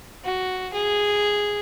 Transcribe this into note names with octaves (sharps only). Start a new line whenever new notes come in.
F#4
G#4